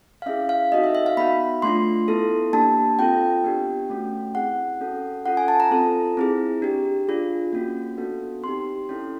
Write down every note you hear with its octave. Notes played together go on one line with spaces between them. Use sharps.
F5
C#4 E4 G#4 E5
F5
C4 D#4 F#4 A4 D#5
E5
E5
F5
B3 D#4 F#4 B5
A3 D4 F4 C6
B3 E4 A4
A#3 D4 G4 A5
C4 F4 A4 G5
B3 D4 G4
A3 C#4 F#4
C4 E4 G#4 F#5
C#4 F#4 A4
C#4 F4 A4 F#5
G#5
A5
A#5
C4 F4 A4
C4 E4 G#4
D4 G4
D4 F4 G#4
A#3 C#4 F#4
B3 D4 F#4 A4
C4 D#4 G4 C6
C#4 E4 A4